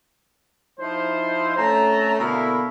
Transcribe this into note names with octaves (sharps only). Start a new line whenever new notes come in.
F3 D#4 E4 C5
A3 C4 C#4 A#5
B2 D3 A#3 E4 A#4 F5